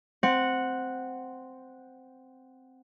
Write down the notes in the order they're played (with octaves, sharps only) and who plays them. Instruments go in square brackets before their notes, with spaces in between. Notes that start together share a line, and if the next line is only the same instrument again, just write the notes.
[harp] C4 F#5